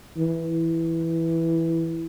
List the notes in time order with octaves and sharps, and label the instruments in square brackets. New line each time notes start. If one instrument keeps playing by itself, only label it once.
[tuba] E3